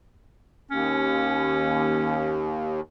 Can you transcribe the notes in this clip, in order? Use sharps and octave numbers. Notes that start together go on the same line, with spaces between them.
D#2 C#4